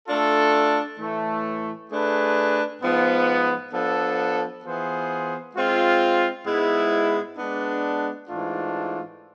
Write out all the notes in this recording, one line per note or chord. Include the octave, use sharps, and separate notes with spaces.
A3 D4 F4 A4
A2 E3 A3
A3 D4 G#4 B4
G#2 F3 B3
F3 B3 D4 A4
E3 B3 F4 G#4 C5
G#3 C4 F4
G#2 G#3 B3 E4
G#3 B3 D4
G#2 E3 A3 D4 F4